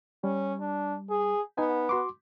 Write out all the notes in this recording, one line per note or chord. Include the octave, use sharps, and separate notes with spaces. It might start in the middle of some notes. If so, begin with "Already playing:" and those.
G3 C#4
D4
G#4
B3 D#4 G#5
F#4 C6 D6